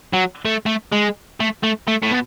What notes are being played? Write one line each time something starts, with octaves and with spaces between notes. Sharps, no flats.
F#3
A3
A3
G#3
A3
A3
A3
A2
B2